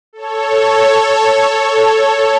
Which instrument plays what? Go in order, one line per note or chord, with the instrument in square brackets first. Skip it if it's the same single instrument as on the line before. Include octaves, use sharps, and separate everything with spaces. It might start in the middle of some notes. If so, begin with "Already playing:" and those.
[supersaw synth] A4 C#5